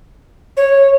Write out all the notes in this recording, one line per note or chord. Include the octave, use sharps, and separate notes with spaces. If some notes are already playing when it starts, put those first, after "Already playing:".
C#5